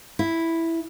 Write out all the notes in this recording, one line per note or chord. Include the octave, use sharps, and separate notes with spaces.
E4